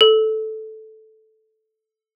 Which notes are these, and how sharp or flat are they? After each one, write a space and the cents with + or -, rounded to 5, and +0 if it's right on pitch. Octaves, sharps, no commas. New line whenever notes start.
A4 -10